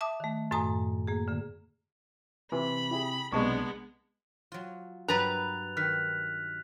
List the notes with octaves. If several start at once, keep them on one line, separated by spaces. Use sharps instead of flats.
E5 A5 D6 D#6
D#3 A3
F#2 A2 A3 G#5 A#5 D#6
A#3 G#4
D3 A#3
C3 E3 B5
E4 G4 G#4
B1 C3 G#3 B3 D4 D#5 A5 C#6
F#3 F4
G2 F#3 A#4 B4 A#5 F#6 A6 F7
D#3 F6 F#6 B6